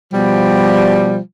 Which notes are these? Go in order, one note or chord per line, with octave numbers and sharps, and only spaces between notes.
B2 F3 G3